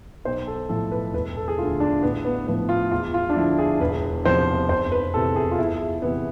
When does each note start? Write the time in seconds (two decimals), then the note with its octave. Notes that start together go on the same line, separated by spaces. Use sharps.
0.25 B1 C5
0.47 A4
0.69 A2 F3 A4
0.92 B4
1.13 E1 B4
1.36 A4
1.48 G#4
1.58 D2 F4
1.62 D3
1.80 D4
2.02 A1 B3
2.25 B3
2.47 A2 F3 B3
2.69 F4
2.91 E2 F4
3.14 F4
3.29 D4
3.36 D3 F3 E4
3.58 G#4
3.80 E1 B4
4.25 E2 C3 F3 C5
4.69 F1 C5
4.92 B4
5.14 E2 C3 E3 A4
5.36 G#4
5.51 F4
5.59 E2 E4
6.02 C3 E3 B3